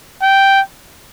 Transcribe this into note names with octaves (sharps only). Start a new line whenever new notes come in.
G5